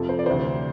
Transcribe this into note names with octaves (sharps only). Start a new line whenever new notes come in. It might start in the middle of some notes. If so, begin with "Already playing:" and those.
Already playing: F2 C3 F3 A4
C5
D5
D2 C3 E3 C5